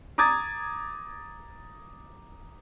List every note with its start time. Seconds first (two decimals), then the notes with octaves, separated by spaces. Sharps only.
0.18 A#5 D6 D#6 G#6 A6